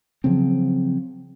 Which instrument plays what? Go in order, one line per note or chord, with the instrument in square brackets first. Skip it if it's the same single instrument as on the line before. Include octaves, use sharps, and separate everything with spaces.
[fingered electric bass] C#3 F3 F#3 C4